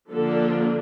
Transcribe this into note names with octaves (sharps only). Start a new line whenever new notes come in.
D3 F3 A#3 D4 A4